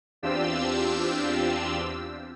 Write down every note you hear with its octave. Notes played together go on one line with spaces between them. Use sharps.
E2 C4 D4 F4 G4 E6